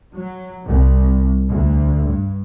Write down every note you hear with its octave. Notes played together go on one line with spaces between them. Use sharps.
F#3
C2
D2
G2